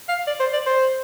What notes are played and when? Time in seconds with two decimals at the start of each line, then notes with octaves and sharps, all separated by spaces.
0.09 F5
0.27 D5
0.40 C5
0.53 D5
0.66 C5